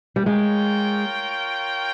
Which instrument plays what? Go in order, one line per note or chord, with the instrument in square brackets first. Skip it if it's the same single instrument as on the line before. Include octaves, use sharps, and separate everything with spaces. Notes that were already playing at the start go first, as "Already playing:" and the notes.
[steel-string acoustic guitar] G3
[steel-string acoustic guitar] G#3 [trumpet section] F4 A#4 C#5 G5